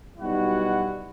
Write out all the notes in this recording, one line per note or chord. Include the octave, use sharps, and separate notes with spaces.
B1 G3 D#4 E4 F#4 F#5